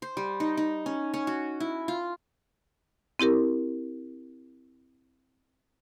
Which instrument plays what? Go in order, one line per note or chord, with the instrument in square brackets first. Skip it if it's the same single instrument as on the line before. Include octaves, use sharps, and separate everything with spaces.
[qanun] C5
G3
D#4
D#4
C#4
C#4
F#4
E4
F4
[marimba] C4 E4 G4 A#4